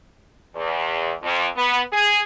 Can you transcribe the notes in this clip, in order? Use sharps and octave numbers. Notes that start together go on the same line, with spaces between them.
E2
F2
B3
G#4